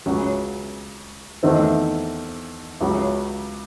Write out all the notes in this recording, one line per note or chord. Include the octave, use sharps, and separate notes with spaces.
C#2 C#3 F#3 C#4
E2 D#3 A3 C4 D#4
C#2 C#3 F#3